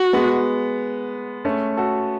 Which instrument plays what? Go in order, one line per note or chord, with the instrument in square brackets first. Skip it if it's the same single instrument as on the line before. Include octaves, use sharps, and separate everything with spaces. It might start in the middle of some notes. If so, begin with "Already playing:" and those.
Already playing: [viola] F#4
[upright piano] G#3 B3
A3 C#4
F#4 A4